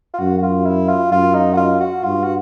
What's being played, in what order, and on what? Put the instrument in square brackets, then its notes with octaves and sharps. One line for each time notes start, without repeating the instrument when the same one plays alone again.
[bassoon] F4
[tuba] F#2 [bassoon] F#4
[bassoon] F#4
F4
E4
F4
[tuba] F#2 [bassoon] F4
[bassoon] D#4
F#4
F4
F#4
[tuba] G2 [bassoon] F4
[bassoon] F#4